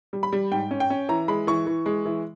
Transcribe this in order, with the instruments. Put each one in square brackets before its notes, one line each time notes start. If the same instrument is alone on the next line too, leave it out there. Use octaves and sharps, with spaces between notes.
[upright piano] G3
B5
G3
G#2 G5
C#4
G5
C#4
E3 A#5
G#3 B5
E3 C#6
E3
G#3
E3